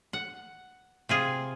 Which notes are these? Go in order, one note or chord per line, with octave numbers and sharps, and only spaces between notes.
F#5
C3 F4 G#4